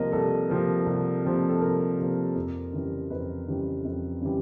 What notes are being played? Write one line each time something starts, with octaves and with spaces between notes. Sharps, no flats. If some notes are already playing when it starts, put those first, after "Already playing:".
Already playing: C2 C3 F3 A#3 A#4 D#5
C2 A4
C3 F3 A#3
C2
C3 F3 A#3
A4
C2 A#4
C3 F3 A#3
F2
C#3 E3 G3
F2 B4
C#3 E3 G3
F2
C#3 E3 G3